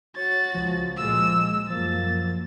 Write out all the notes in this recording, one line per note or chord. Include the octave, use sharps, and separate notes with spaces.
F#4 C#5 A6
C#2 F3 G#3
A#2 G#3 A#3 E6
G#3
F#2 F3 A#3 A6